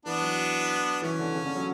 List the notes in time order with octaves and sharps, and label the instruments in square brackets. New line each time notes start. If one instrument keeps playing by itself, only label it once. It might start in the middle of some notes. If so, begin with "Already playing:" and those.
[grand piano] E3 [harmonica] B3 D4
[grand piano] F#3
[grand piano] E3 [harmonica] C#4
[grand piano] D3
C#3
D3
F#3